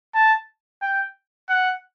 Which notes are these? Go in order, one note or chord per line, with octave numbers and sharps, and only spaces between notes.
A5
G5
F#5